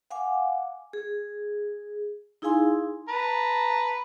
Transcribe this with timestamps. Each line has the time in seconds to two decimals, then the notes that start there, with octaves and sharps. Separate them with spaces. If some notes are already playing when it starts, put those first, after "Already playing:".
0.10 F5 F#5 G#5 D6
0.93 G#4
2.42 D#4 E4 G#4 F5 G#5 C6
3.09 B4 A5 A#5